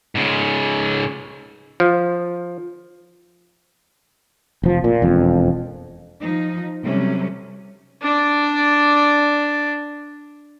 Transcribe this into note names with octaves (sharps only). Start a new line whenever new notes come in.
G#2 C#3
F3
F1 F3
A#2
E1 F2
F3 D#4
C3 F#3 G3 A3 C#4
D4 D5